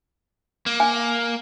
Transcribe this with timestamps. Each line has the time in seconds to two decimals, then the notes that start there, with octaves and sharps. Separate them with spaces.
0.66 A#3
0.80 G#5